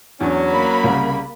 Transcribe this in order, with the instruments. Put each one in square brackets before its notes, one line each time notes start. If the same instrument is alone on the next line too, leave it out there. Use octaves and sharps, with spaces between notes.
[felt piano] E2 D4 [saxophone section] F#3 C#4
[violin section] A#3 B5
[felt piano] C2 C#3